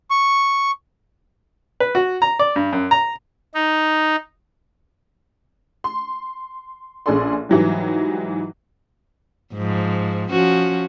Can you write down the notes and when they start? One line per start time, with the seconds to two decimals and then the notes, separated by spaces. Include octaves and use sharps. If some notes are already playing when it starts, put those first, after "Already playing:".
0.11 C#6
1.80 B4
1.95 F#4
2.22 A#5
2.39 D5
2.56 G2
2.73 F#2
2.91 A#5
3.54 D#4
5.84 C6
7.06 A#1 C#4 G#4 A4 D5 C6
7.49 G#2 E3 F#3 G3
9.54 G#2 F3
10.30 F3 C#4 F#4